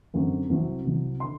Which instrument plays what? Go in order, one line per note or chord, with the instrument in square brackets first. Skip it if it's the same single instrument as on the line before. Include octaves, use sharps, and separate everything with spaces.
[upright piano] F#2 D3 F#3 C4
C2 C3 F#3 C4
C2 C3 F#3 C4
D3 C6